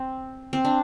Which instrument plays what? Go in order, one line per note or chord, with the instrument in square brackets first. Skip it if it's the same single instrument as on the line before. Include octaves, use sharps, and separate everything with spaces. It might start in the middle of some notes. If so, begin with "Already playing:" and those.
Already playing: [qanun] C4
C4
D4